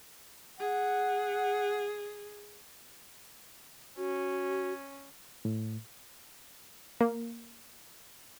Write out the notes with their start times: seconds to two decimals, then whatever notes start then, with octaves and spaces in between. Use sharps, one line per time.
0.59 G#4 F#5
3.97 C#4 F#4
5.45 A2
7.01 A#3